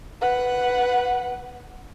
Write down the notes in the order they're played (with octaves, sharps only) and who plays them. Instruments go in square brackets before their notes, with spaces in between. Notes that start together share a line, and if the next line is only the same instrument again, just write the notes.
[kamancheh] B4 F#5